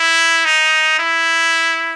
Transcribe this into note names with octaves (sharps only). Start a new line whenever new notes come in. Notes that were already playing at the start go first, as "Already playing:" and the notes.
Already playing: E4
D#4
E4